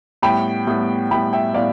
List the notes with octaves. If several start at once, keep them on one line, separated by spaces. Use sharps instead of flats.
A2 G3 B3 G5 B5
A2 G3 B3
A2 G3 B3 G5 B5
E5 G5
A2 G3 B3 D5 F5